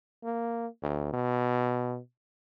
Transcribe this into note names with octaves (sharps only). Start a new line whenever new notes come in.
A#3
D2
B2